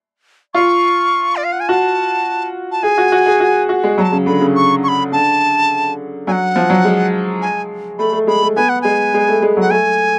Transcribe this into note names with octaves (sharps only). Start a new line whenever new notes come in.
F4 C#6
D5
F5
F#5
G#5
F#4 A5
A5
G#4 G#5
F#4
F#4
G#4
F#4
F#4
G#3
F#3 A5 B5
C#3
D3 B5
C#3
C#6
C#6
B5
D3 A5
F#3 F#5 G#5
F3
F#3
G#3
G#5
A3 B5
A3
G#3 B5
A3
B3 G#5
F#5
G#3 G#5
G#3
A3
G#3
F#3 F#5
A3 G#5